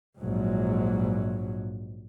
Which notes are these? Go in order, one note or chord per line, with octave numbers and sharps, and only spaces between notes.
A#1 G#2 F#3